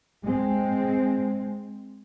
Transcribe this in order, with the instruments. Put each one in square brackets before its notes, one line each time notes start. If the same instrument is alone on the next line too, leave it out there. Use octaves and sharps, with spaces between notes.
[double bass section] G#3 C4